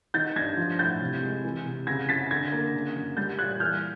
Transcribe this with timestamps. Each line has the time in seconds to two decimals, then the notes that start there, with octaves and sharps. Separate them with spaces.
0.14 D#3 G6 A6
0.36 G2 G#6 A#6
0.57 F3
0.79 A2 G6 A6
1.01 C3
1.22 G#3
1.44 E3
1.66 C3
1.87 C#3 G#6 A#6
2.09 F#2 A6 B6
2.31 D3 G#6 A#6
2.52 A#3
2.74 C#3
2.96 F#2
3.17 G3 G6 A6
3.39 A#2 F#6 G#6
3.60 E3 F6 G6